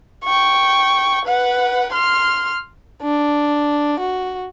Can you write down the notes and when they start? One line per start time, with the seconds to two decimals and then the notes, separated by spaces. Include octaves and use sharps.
0.24 G5 C#6
1.26 B4 F#5
1.93 C6 F6
3.03 D4
4.00 F#4